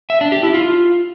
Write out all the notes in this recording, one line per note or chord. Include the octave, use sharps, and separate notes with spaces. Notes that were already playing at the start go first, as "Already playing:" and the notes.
E5
D4
G4
E4
F4